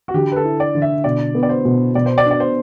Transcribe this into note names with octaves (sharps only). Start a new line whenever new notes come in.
F#4
D3 G4
B4
A4
E4
D5
D3
E5
B2 D5
B3
D5
C5
B2
B2 D5
C5
D5
D4
D5
C5